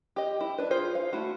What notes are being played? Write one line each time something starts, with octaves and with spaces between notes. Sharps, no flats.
G4 D#5
E4
D4 B4
F4 G#4 C5
F5
A3 E4 F#4